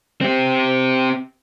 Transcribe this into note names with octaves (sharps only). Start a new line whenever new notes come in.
C4 G4